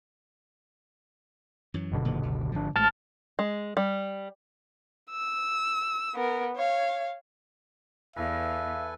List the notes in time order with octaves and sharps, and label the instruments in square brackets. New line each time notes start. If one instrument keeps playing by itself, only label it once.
[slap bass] F#2 E3 F#3
[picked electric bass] F#1 B2 D3
[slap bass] A#2 D#3 F3
C#2
[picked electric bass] G#1 D4 [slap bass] D3 F3
[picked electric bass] A1 [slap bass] A2 G#3 A3 [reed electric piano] A5 F6 A6
[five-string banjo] G#3
G3
[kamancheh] E6
B3 A#4
C#5 F5
[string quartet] E2 [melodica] A4 B4 G#5 [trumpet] E5 [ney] F5